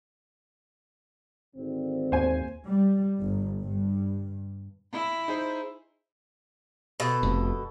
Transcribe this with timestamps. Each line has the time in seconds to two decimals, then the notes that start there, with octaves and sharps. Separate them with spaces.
1.55 G#1 D3 C4
2.12 D#2 C5 G#5
2.67 G3
3.20 G1
3.61 G2
4.93 E4
5.28 D#4 G#4 C5
7.00 B2 A4
7.23 F1